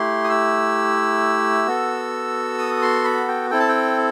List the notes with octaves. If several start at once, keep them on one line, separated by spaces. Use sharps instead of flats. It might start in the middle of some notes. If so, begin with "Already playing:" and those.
Already playing: A3 E4 G4 C6
D#6
E6
B3 F#4 A4
D#6
C6
B5
G5
C4 E4 A4 G5
A5
G5